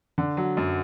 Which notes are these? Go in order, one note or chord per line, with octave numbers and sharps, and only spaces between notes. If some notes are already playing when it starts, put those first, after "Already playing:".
D3
F#3
F#2